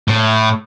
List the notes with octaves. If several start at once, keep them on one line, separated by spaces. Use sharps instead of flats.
A2